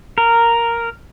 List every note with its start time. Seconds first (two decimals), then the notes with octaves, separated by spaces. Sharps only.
0.18 A#4